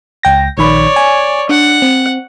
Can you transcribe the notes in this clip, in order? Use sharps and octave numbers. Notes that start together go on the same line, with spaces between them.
C#2 G5 A#6
A#1 D#3 C#5 D5 B5
G#5
D4 F#5
C4